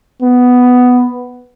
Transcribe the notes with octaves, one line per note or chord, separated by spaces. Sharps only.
B3